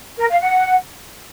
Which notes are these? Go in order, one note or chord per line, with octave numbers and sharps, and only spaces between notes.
A#4
F5
F#5